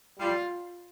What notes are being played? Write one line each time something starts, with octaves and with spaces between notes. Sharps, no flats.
G3 F4